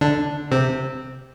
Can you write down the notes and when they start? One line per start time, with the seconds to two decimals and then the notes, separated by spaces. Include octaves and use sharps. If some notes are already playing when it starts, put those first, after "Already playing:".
0.01 D3 D4
0.52 C3 C4